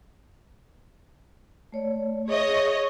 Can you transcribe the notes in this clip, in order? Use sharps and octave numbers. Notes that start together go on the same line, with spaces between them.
A3 C#5 D5
G#4 C#5 D#5 E5